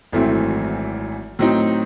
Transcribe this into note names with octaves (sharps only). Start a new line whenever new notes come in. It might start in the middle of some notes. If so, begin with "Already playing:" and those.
G#1 F#2 E3 A3 C4
A2 F#3 C4 D#4